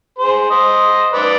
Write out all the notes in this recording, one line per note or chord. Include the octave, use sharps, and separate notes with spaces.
G#4 C5
C5 D#5
B4 D5